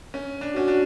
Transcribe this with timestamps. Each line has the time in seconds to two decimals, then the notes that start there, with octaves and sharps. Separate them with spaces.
0.14 C#4
0.41 D4
0.55 C#4 F#4
0.68 D4